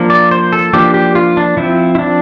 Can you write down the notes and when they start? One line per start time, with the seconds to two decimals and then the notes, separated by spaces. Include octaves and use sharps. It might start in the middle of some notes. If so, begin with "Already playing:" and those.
Already playing: F3 A#3 D4
0.10 D5
0.31 C5
0.52 A4
0.73 F3 A#3 D4 G4
0.94 G4
1.15 F4
1.37 D4
1.57 F3 C4 E4
1.95 E4
1.99 D4